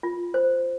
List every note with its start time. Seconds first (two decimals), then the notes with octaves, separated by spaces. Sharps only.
0.03 F4
0.34 C5